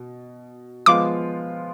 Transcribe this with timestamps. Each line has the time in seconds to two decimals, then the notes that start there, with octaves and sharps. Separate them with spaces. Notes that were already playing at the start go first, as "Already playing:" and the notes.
Already playing: B2
0.86 F3 G#3 B3 F4 D6